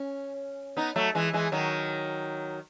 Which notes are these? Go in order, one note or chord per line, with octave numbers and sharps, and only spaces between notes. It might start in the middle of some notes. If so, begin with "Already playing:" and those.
Already playing: C#4
B3 D#4
F#3 A3
E3 G#3
E3 G#3
D#3 F#3